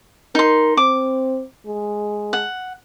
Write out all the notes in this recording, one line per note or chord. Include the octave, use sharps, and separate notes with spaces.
D#4 A#4 C6
C4 D6
G#3
F#5